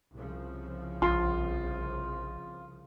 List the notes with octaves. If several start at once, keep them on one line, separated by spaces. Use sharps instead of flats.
C2 C#3 F3
A#1 F4 C6